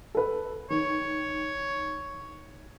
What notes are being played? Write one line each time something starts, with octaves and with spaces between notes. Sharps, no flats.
A4 B4
D#3 C#5